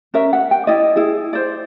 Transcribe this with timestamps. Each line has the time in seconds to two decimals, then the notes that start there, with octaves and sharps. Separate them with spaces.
0.14 C#4 A#4 E5
0.33 F#5
0.51 G5
0.67 E4 D5 D#5
0.96 E4 G#4
1.33 C5 D5